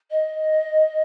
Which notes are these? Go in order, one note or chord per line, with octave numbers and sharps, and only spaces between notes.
D#5